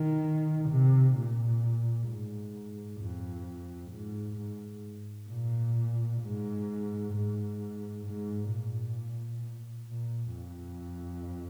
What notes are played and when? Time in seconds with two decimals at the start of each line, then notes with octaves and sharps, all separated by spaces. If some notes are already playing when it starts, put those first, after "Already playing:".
Already playing: D#3
0.69 C3
1.15 A#2
2.07 G#2
3.00 F2
3.90 G#2
4.36 G#2
5.28 A#2
6.21 G#2
7.12 G#2
8.05 G#2
8.49 A#2
9.88 A#2
10.34 F2